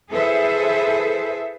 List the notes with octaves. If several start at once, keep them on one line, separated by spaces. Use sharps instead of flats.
E4 G#4 A4 B4 C5 E5